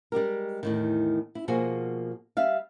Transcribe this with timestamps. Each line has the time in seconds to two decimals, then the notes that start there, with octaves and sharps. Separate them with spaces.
0.12 G3 G#3 G4 A#4
0.63 E2 A2 D#3
1.35 E4
1.48 B2 F3 A#3 F#4 G#4 G#5
2.37 G3 E5 F5